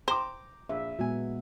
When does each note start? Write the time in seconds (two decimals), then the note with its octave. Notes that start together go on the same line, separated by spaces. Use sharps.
0.08 C5 G5 A#5 D6
0.69 A#1 E5
0.99 A#2 F#3 G#3 B3 G#5